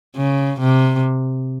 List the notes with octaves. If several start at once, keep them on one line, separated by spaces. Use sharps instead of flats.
C#3
C3